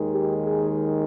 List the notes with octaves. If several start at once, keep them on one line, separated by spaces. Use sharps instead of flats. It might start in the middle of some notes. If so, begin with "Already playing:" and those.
Already playing: D#2 D#3 G#3
G4
G#4